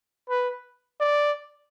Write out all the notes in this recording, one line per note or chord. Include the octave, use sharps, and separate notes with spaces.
B4
D5